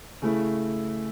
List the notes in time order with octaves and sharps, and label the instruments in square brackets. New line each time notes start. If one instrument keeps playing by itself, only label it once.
[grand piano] C#3 A3 E4